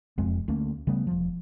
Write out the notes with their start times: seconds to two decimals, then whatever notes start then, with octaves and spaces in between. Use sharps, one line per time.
0.18 E1 F2 G#3 C4
0.48 D2 A3 A#3 C#4
0.87 C#3 G3 A3 B3
1.07 E1 F3